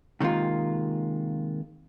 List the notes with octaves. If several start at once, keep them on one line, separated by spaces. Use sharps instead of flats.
C3 D#3 G#3 A#3 F4